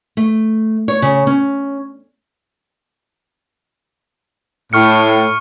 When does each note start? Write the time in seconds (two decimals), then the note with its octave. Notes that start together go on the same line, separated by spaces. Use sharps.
0.17 A3
0.88 C#5
1.02 C#3
1.27 C#4
4.73 A2 C#6 F6 C#7